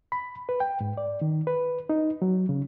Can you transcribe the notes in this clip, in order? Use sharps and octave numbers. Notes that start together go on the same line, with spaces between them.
B5
B4
G5
G#2
D5
D#3
B4
D#4
F#3
C#3